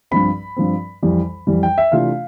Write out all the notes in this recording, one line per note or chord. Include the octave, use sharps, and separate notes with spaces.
G2 F3 C4 B5
G2 F3 C4
F2 E3 G3
F2 E3 G3
G5
E5
C3 E3 A3 D4 F4 F5